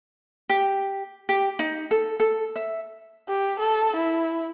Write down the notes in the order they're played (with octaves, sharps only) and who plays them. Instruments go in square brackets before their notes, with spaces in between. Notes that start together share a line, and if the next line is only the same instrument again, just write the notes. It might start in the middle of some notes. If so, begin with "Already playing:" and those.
[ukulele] G4
G4
D#4
A4
A4
E5
[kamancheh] G4
A4
E4